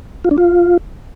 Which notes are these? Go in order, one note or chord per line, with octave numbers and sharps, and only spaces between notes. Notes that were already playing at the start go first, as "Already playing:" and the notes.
F4
D4
F4